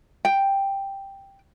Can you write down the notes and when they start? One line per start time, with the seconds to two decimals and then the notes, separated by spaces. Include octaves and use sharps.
0.25 G5